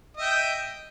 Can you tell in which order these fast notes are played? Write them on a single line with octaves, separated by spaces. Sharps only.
D#5 E5 G5